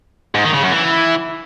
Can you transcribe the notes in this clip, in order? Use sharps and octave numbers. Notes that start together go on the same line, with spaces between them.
G#2
D#3
C#3
F#2
E3